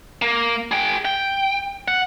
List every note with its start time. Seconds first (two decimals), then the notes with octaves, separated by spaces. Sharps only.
0.22 A#3
0.71 G#4 G5
1.05 G5
1.88 F#5